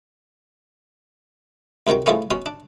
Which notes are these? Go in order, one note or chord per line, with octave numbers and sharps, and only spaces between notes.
C#2 C3 D#3 F#3 G5
E3 F3 G#3 A3 B3 C#4
B2 C#4 C6
D4